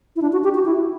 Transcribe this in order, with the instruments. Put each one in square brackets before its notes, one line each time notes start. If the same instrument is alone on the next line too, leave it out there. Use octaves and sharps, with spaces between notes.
[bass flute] E4
D4
F#4
G4
F#4
E4